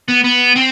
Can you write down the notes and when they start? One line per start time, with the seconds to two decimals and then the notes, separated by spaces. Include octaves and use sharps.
0.08 B3
0.24 B3
0.56 C4